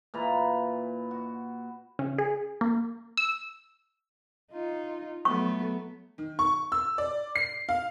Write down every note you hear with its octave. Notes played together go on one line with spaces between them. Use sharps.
A#2 E3 A#5 B5
F#4
C#3
G#4
A#3
E6
D#4 F4
F#3 A3 B3 C#6
D#3
C#6
E6
D5
C7
F5